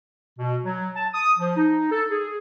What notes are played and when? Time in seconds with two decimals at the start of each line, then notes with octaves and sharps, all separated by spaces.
0.39 B2
0.64 F#3
0.96 A5
1.14 D#6
1.39 F3
1.57 D#4
1.91 A4
2.11 G#4